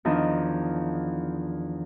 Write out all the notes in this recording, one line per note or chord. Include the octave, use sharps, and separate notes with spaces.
E2 D#3 F3 D4 D#5